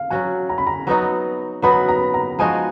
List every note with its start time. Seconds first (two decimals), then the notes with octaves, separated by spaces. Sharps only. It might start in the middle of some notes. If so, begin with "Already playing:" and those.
Already playing: F5
0.10 F#3 C#4 F#4 G#5
0.49 A#5
0.58 B5
0.67 A#5
0.87 F#3 B3 D#4 F#4 A#5
1.62 F#3 B3 D#4 F#4 B5
1.89 A#5
2.14 A#5
2.39 F3 G#3 D#4 F#4 G#5